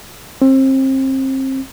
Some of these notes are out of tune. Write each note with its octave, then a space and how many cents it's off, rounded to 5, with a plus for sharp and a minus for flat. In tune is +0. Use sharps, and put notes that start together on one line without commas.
C4 +30